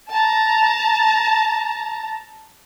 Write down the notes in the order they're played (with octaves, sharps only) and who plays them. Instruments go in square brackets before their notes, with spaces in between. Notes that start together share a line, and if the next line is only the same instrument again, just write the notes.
[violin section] A5 A#5